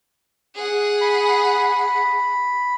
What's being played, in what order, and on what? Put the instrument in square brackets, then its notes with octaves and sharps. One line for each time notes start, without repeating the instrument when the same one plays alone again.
[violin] G#4 F#5
[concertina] B5